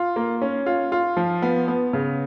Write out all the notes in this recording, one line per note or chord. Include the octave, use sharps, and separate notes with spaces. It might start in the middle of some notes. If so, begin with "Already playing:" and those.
Already playing: F4
A#3
C#4
F4
F4
F3
B3
B3
C#3